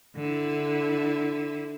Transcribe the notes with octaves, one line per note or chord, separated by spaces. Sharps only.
D3 E4